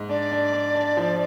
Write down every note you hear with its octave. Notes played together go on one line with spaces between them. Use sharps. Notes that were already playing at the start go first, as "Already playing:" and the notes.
Already playing: G#2
D4 D5
D4
D4
D4
F3